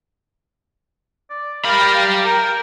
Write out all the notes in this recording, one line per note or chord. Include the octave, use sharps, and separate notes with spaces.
D5
G3 A#4 F5 B5
A#4 G5